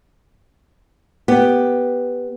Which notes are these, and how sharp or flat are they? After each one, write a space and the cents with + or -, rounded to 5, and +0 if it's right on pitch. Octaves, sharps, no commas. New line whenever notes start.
B3 +0 G4 +5